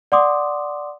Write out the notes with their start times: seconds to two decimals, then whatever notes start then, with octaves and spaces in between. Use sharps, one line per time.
0.12 D5 F#5 C6 D6 D#6